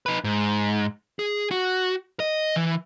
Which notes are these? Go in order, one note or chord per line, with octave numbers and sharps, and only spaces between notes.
D#4 B4
G#2
G#4
F#4
D#5
E3